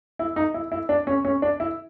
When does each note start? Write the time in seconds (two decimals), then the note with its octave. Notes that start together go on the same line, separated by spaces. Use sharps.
0.19 E4
0.36 D#4
0.54 E4
0.72 E4
0.89 D4
1.07 C#4
1.25 C#4
1.42 D4
1.60 E4